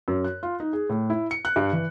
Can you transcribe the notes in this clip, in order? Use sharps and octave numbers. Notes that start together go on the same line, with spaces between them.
F#2
F#6
F4
D#4
G#4
A2
E4
C#7
F#6
G2
E3